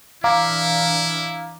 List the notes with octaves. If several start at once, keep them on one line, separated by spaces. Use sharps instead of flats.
E3 D4 E4 F5 A#5 D6